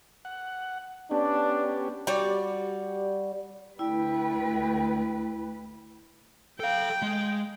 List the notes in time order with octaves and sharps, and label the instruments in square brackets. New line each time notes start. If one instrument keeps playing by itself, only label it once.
[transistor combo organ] F#5
[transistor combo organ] B3 C#4 G4 [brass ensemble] D4
[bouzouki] G3 F#4 D5
[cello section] D2 A3 B4 [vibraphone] E4 [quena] G5
[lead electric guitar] A4 F5 [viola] G5
[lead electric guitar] G#3